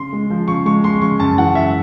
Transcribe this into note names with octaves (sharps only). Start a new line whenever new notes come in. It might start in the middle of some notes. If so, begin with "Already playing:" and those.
Already playing: C#3 C6
G#3
F3
C#3 C#6
G#3 C#6
G#3 C6
C#3 C#6
F#2 A5
E3 F#5
F#2 E5